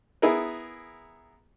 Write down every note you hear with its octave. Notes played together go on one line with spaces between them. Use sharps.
B3 E4 G#4 A#4